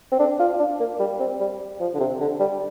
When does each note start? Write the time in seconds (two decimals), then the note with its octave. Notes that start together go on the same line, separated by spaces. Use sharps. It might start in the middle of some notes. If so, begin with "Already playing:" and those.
0.12 C4
0.19 D4
0.39 F4
0.59 D4
0.80 A#3
0.99 G3
1.20 C4
1.40 G3
1.80 F3
1.94 D3
2.00 C3
2.20 D3
2.40 G3